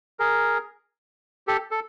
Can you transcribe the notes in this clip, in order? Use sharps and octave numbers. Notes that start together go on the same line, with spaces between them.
G#4 A#4
G4 A4
A4